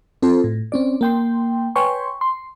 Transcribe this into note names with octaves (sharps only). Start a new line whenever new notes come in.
C4 F4 A4 C5
A2
C4 C#4 D5
A#3 G5 C6
B4 C#5 G5 G#5 C6 C#6
C6